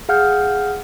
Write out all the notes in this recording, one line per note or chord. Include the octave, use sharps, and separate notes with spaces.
G#4 F5 F#5 F6 G6